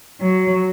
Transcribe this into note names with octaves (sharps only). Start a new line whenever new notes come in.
F#3